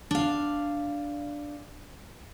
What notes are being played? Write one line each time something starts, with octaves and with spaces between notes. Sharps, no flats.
D4 F5